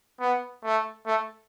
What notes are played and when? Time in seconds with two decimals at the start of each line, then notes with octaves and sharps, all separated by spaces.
0.20 B3
0.64 A3
1.06 A3